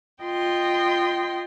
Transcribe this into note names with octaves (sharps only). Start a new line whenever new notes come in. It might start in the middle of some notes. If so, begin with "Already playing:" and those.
F4 D#5 G5 C6